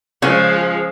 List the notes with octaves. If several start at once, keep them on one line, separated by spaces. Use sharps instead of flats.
C#3 F3 G#3